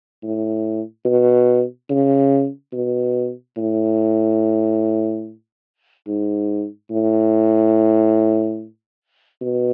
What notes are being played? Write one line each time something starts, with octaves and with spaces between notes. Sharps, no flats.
A2
B2
C#3
B2
A2
G#2
A2
B2